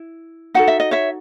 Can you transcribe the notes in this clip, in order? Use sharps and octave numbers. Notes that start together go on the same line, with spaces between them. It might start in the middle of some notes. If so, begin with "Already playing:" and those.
Already playing: E4
D#4 F#4 A4 F#5
E5
D#5
C#5 E5